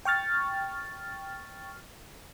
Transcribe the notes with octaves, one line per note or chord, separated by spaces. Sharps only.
G5 C#6 F6 A6